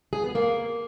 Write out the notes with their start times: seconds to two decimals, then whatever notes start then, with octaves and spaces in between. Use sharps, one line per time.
0.13 G#4
0.24 B3
0.35 A#3